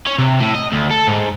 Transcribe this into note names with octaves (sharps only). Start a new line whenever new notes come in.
C#4
C3
A2
D#5
D2
A4
G#2